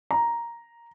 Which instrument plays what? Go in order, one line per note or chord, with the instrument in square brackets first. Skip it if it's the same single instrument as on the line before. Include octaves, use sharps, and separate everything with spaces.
[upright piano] A#5